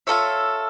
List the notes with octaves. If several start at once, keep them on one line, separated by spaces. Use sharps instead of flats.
F4 A4 C#5 E5